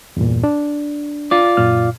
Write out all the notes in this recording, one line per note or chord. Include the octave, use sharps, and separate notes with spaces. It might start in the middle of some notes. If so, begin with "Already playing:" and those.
E2 G2 A#2
D4
F4 D5
F#2 A#2 F6